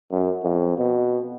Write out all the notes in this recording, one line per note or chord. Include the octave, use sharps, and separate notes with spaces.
F#2
F2
B2